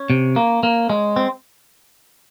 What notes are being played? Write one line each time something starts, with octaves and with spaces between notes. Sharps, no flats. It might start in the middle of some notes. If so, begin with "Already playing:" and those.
Already playing: C#4
C3
A#3
A#3
G#3
C4